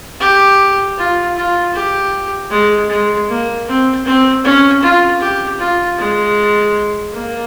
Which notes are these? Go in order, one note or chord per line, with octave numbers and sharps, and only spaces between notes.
G4
F4
F4
G4
G#3
G#3
A#3
C4
C4
C#4
F4
G4
F4
G#3
A#3